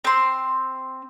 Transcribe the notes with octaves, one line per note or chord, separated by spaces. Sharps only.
C4 C6